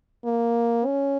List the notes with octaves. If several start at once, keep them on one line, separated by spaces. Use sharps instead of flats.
A#3
C#4